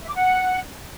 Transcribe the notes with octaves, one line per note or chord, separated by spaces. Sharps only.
E5
D6
F#5